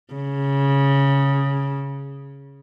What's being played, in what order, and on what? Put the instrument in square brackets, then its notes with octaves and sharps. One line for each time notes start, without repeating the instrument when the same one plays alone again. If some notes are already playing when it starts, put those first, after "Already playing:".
[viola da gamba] C#3